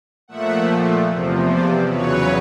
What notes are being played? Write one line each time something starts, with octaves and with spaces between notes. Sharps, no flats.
A#2 F3 A3 E5 F#5
E2 C3 F3
C5 D5
E2 C#3 F#3 B4 C#5